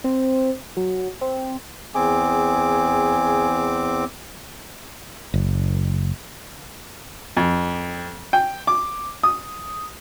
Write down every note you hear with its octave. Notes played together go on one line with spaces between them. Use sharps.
C4
F#3
C4
E2 C4 G#4 D6
F#1
F2
G5
D6
D#6